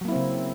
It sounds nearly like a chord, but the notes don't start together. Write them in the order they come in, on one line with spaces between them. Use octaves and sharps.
F#3 A#3 E4 C4 C#3